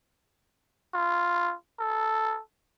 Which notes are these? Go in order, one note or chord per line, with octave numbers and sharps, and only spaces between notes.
F4
A4